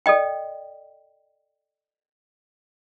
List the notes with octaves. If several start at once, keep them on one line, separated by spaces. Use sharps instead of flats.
A4 D5 D#5 G5